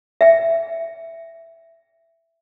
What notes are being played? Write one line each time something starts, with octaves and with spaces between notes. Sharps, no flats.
E5 G5